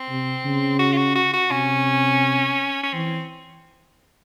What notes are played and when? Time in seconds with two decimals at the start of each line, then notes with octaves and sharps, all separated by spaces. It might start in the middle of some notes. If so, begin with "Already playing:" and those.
Already playing: C4
0.09 C3
0.45 C#3
0.79 F#4
0.93 F4
0.97 F#4
1.16 F#4
1.33 F#4
1.51 C3 C#4
2.83 C#4
2.94 E3 C4